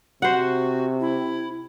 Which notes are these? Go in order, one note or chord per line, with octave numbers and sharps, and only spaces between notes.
C3 F#4 C5 F#5
E4